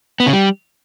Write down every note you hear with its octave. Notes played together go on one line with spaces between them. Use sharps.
B3
C#3
G3